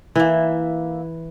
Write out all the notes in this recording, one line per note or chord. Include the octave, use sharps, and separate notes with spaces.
E3 A#3 E5